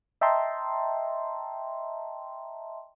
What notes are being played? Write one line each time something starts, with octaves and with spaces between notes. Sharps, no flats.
D#5 E5 G5 A5 A#5 C6